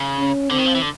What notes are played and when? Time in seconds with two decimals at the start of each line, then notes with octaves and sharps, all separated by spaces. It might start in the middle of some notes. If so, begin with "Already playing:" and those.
Already playing: C#3
0.19 C#4
0.50 D3 C4
0.58 D#3
0.66 F3
0.75 E3
0.82 D3